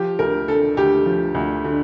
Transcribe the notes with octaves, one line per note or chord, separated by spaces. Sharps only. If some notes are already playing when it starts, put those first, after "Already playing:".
Already playing: F3 G4
D2 A#4
D3 A4
D2 G4
F3
D2
D3